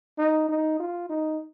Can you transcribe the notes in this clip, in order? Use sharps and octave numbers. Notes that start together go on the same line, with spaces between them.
D#4
D#4
F4
D#4